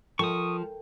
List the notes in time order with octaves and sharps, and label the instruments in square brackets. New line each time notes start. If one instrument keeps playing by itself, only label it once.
[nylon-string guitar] F3 [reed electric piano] A4 A#4 G5 [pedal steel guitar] C#6 D#6